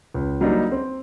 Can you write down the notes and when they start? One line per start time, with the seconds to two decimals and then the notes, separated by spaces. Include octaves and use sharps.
0.14 C#2
0.41 F#3 G3 A#3 D4 D#4
0.72 C4